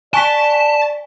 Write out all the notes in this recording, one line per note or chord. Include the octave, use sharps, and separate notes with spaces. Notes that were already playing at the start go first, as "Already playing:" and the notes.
D5 G#5 A5 C#6 B6